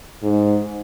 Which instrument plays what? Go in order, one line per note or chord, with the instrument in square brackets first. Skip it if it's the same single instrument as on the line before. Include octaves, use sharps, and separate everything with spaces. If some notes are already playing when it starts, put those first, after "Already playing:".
[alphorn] G#2